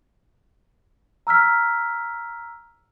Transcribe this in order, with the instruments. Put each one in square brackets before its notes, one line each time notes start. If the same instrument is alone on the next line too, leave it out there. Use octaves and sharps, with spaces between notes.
[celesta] A#5 E6 F6 B6